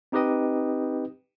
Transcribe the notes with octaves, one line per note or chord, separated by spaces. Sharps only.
C4 D#4 G4 B4 D#5 G5